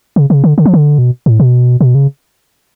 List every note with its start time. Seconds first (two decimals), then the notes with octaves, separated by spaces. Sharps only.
0.16 C#3
0.30 C#3
0.44 D3
0.58 D3
0.65 F3
0.74 D3
0.98 B2
1.26 A2
1.40 B2
1.81 B2
1.95 C#3